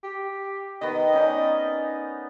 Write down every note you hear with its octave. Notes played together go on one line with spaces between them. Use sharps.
G4
D#3 B3 D#5
C#4 D#4 D5